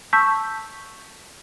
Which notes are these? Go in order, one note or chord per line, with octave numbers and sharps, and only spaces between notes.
A5 C#6 E6 G6 B6